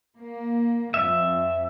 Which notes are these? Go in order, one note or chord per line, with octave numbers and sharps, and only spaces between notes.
A#3
F2 E5